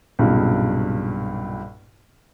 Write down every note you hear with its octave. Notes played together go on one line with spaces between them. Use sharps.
B1 G2 A#2 C#3